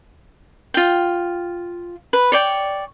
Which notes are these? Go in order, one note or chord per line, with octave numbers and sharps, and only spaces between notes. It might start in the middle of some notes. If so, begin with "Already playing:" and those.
F4 G5
B4
C#5 D5 G5